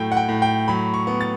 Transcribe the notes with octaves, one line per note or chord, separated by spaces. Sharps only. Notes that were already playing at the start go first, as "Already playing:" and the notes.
Already playing: A2 F#3 A3 G5
F#5
G5
A2
G5
F#3 B5
C#6
B3
A6